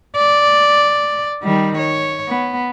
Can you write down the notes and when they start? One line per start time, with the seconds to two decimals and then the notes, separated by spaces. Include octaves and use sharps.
0.17 D5
1.43 D#3 G3
1.78 C#5
2.29 B3